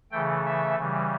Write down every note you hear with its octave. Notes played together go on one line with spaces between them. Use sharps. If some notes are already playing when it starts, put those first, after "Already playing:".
C#3 E3 A3 G5
E5
C#3 E3 G3